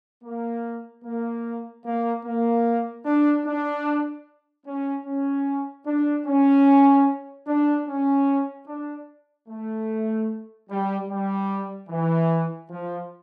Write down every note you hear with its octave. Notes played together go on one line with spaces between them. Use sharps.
A#3
A#3
A#3
A#3
D4
D4
C#4
C#4
D4
C#4
D4
C#4
D4
A3
G3
G3
E3
F3